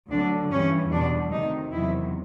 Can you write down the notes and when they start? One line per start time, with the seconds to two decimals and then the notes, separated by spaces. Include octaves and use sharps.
0.10 D2 D3 F#3 D4
0.50 G2 E3 G3 C#4
0.91 E2 B2 G3 D4
1.32 D2 C3 D#3 D#4
1.72 E2 C3 D#3 F#3 E4